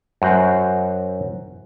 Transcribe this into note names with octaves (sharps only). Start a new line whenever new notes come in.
F#2 F#4 C5